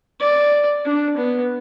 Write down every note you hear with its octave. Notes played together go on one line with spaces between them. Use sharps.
D5
D4
B3